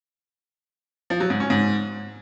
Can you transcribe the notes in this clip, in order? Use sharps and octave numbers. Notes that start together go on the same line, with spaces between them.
F3
F#3
G#2
C#4
G#2